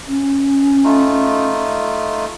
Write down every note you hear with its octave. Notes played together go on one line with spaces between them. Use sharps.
C#4
A3 D#4 F4